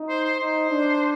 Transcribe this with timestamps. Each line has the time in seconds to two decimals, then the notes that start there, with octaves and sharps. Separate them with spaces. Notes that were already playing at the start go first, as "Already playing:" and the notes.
Already playing: D#4
0.09 C5
0.24 C5
0.39 D#4 C5
0.69 D4